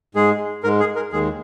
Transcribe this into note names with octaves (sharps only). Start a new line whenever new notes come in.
G#2 G#3 G#4
G#2 G#3 A#4
G#4
A#4
D#2 D#3 G#3 G#4